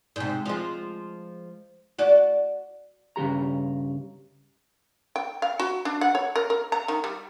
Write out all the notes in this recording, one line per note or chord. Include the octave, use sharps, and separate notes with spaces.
G#2 C3
F3 G#3
F#4 D5
G2 C#3 E3 G4 A#5
G5
F5
F#4
D4
F#5
C#5
A#4
A#4
A#5
D#3
G3